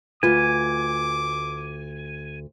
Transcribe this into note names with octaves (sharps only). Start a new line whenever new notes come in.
D2 F4 B4 G#5 D6